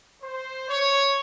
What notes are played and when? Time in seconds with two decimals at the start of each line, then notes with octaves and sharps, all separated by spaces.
0.22 C5
0.69 C#5